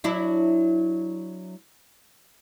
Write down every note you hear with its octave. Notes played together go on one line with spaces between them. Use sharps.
F#3 D4 E4